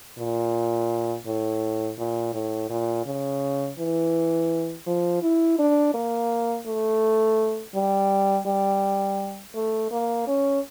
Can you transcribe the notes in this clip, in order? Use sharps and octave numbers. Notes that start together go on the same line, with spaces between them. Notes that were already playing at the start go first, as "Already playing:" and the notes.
A#2
A2
A#2
A2
A#2
C#3
E3
F3
E4
D4
A#3
A3
G3
G3
A3
A#3
C#4